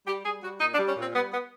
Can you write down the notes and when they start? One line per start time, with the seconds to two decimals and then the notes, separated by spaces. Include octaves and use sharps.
0.07 G3 G4
0.25 G3 G#4
0.43 G3 F#4
0.60 A#2 D#4
0.75 D4
0.79 G3
0.87 C#4
0.96 A#2 C4
1.14 G3 B3
1.33 B3